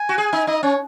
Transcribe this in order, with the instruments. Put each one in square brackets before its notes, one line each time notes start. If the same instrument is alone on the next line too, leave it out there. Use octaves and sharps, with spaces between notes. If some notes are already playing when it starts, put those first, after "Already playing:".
Already playing: [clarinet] G#5
[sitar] F#4
G#4
D#4
[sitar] D#4 [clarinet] D#5
[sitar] C#4 [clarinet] C#5